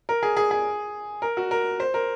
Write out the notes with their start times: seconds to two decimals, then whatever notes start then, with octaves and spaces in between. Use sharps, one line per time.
0.09 A#4
0.23 G#4
0.37 G#4
0.51 G#4
1.22 A#4
1.37 F#4
1.51 A#4
1.80 C5
1.94 A#4